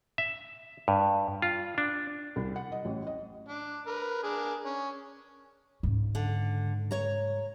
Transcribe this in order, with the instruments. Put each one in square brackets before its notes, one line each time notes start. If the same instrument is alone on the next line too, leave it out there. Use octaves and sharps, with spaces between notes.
[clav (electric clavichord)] E5
G2
F4
D4
[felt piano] C2
F#5
D#5
A1
D#5
[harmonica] D4
A#4 B4
D4 G#4 A#4
C#4
[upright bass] G#2 C#3
[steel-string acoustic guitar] D3
C#5 A#5